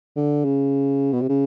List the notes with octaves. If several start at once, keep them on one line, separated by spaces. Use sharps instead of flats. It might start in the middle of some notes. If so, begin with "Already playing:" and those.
D3
C#3
B2
C3
C#3